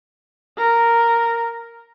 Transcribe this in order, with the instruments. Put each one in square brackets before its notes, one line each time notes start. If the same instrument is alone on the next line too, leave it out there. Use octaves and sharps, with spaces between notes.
[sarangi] A#4